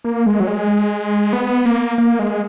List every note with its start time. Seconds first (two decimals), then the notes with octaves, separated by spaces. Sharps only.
0.04 A#3
0.26 G#3
0.40 F#3
0.47 G#3
1.33 B3
1.65 A#3
1.98 A#3
2.19 G#3